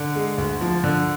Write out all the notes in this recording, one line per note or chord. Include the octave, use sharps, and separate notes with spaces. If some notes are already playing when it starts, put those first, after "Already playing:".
Already playing: D3
G#3
D2
F3
D3